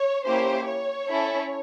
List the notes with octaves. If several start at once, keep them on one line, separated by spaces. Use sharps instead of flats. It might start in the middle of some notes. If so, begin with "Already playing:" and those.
Already playing: C#5
A#3 C#4 E4 G4 C5
C#5
C#4 E4 A4